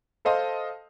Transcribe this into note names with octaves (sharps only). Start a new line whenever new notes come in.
A4 C5 D#5 F5 A5 C6